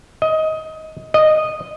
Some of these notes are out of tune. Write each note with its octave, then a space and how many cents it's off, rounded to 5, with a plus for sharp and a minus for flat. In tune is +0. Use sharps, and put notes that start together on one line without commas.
D#5 +20
D#5 -10